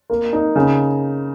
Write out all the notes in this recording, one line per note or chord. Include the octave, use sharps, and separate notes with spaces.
A#3
D#4
C#3